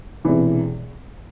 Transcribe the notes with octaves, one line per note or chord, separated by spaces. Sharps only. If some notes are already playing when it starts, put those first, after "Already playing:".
E1 E2 C3 E3